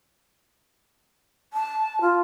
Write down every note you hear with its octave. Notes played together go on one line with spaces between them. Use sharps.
A5
F4